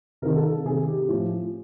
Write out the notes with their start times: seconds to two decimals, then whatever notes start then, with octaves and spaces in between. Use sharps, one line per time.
0.22 C3 A#4
0.26 D#3
0.36 A4
0.51 A4
0.65 C3 D#3 G#4
0.87 G4
1.08 A2 F3